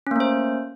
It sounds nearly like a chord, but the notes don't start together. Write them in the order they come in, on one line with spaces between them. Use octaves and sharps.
C#4 A#3 A3 C5